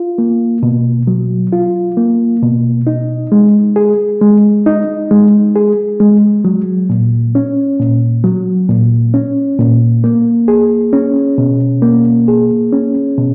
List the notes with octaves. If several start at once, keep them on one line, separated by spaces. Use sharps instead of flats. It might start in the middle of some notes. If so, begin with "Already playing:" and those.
Already playing: F4
A#3
B2
F#3
F4
A#3
B2
D#4
G#3
G#4
G#3
D#4
G#3
G#4
G#3
F#3
A#2
C#4
A#2
F#3
A#2
C#4
A#2
A#3
G#4
C#4
B2
A#3
G#4
C#4
B2